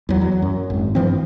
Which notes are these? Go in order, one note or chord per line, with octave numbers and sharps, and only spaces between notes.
E2 F#3
F#3
F#2
G#1
G2 E3 F3 C4